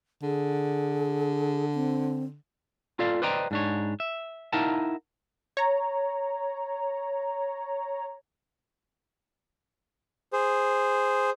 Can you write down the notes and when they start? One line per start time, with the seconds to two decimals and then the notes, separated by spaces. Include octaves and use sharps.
0.23 D3 G#4
1.74 C4
2.99 F4 A4 D5 F5
3.22 B4 C5 D5 D#5 G5 A#5
3.51 G#2 D4 C#5
4.00 E5
4.53 D#4 E4 A#4 F5 F#5 A5
5.57 C#5 A#5
10.33 G#4 C5